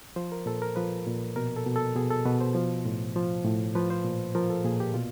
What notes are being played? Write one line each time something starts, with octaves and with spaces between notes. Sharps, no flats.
F3 C5
A#4
A#2 A4
A#4
F3 B4
A#2
B2 A#4
A4
B2
A4
B2 G#4
A4
B2 B4
C5
F3
A2
F3
A2
F3 B4
C5
A#2
F3 A#4
A4
A#2 G#4
G4
B2 F4